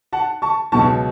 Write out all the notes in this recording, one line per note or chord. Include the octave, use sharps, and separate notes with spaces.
F#5 A5
A5 C#6
C#2 B2 F#3 A5 C#6